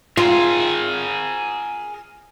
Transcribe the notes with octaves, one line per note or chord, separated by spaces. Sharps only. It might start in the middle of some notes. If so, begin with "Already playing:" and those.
F4 G#4 A#4